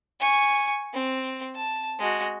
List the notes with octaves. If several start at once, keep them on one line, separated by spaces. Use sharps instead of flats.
G#5 C#6
C4
A5
G#3 F#4